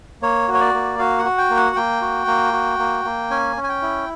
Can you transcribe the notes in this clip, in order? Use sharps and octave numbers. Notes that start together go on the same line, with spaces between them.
A#3 C#5
F#4
C#5
D5
A#3
F#4 F5
F#5
F#4
G5
A#3
F#5
A#3 G5
F#4
A#3
F#4
A#3
A#3
C#4 G#5
C#4
G#5
G5
E4